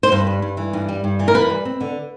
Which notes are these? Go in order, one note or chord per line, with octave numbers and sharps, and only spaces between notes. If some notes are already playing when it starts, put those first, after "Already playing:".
C5
G2 B4
G3
G2
E3
G2
G3
G2
E3
A#4
F#2 B4
G3
C4
D3